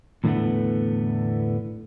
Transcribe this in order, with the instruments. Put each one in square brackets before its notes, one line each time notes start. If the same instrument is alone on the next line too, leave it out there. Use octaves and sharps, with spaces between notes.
[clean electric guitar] E2 A2 D3 E3 A3 B3